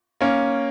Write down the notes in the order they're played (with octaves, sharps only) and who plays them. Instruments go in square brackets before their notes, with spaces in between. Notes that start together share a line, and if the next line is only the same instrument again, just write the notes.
[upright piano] A#3 C#4